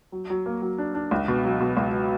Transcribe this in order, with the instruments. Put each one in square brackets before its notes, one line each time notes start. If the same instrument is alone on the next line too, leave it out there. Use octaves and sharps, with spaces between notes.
[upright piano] F#3
F#3
A#3
F#3
D4
D4
C#2
B2
F#3
B2
C#2